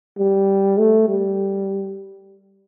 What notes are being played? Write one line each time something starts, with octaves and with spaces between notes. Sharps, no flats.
G3
A3
G3